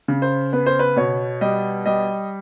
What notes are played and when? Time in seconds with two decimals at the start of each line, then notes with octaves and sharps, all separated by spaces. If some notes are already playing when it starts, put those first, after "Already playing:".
0.08 C#3
0.22 C5
0.53 B3 B4
0.66 C5
0.79 B4
0.96 B2 C#5
1.41 G3 D#5
1.86 G3 D#5